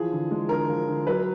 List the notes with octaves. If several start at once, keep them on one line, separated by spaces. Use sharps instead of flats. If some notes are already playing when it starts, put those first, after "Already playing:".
Already playing: E3 F3 G#4
D3
G#3
D3 A#4
F3
D3
F#3 B4